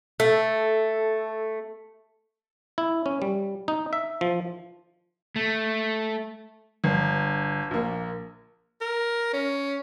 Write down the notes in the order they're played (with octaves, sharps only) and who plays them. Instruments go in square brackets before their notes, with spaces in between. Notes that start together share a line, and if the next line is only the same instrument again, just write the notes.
[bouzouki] A3 [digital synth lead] A4
[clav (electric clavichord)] E4
C#4
G3
D#4
E5
F3
[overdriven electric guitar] A3
[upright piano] G1
A#1 A#3
[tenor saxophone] A#4
C#4